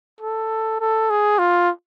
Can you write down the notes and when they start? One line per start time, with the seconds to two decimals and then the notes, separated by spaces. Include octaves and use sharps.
0.21 A4
0.80 A4
1.10 G#4
1.38 F4